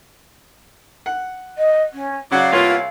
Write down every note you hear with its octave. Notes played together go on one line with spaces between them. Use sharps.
F#5
D#5
C#4
C#3 F#3 D5 F5 F#5
C2 A#3 B3 F4 C#5